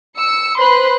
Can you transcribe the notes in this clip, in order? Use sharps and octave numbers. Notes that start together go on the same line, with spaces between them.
E6 C#7
B4 C5 B5 C6 F#6